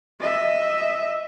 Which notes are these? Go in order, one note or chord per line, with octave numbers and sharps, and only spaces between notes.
D#5 E5